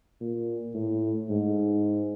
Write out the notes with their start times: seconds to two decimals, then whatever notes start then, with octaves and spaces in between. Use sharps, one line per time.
0.21 A#2
0.75 A2
1.30 G#2